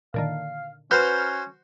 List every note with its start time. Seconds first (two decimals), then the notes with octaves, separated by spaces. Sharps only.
0.14 A#2 D3 D#3 F5
0.91 C#4 F#4 B4 C5 F6 G6